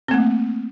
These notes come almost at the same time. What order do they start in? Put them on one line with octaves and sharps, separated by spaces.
C4 A#3 A3